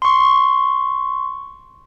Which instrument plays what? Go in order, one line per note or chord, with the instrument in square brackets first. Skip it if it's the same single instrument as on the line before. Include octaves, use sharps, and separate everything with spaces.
[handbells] C6 C#6